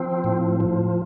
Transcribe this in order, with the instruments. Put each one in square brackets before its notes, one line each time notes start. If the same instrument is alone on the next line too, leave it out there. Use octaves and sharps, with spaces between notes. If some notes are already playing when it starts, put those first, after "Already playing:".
Already playing: [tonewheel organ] F3 C4
A2
F3